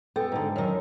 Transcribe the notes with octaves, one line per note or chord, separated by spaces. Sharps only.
B3 A4 G5
G#2 D3
F#2 D#3